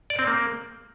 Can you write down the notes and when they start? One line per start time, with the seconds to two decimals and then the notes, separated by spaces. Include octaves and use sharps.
0.10 D5
0.19 C4
0.27 A#3